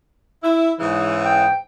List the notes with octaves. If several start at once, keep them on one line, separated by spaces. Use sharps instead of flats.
E4
G#2 C#3 E3
G5